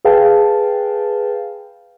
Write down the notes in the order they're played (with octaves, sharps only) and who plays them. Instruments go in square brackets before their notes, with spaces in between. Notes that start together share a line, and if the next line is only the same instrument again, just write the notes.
[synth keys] G#4 B4 F5 G5 A5